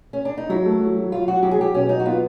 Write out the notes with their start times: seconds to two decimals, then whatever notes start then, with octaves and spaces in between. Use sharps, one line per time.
0.13 C#4
0.25 D4
0.37 D#4
0.49 F#3 E4
0.66 A3
0.81 F#3
0.97 F#3
1.12 F#3 F4
1.28 F#3 F#4
1.43 F#3 G4
1.51 G#4
1.58 F#3 G4
1.74 B2 C#4
1.89 F#3 D#4
2.00 F#4
2.06 B3 F4